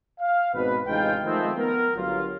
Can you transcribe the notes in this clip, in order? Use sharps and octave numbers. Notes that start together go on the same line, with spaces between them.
F5
G#1 B2 C4 B4
A1 C3 G#3 D#4 F4 G5
D#3 F3 G#3 A3 B3 C4
B3 A#4
G1 F#3 F4